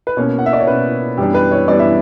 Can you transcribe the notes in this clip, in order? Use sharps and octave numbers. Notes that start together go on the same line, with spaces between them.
B4
B2 A#3 C#4 C#5
F#5
E5
D5
C#5
B2 A#3 C#4 B4
F#2 E3 G3 B3 D4 G4
B4
C#5
F#2 E3 G3 B3 D4 D5
E5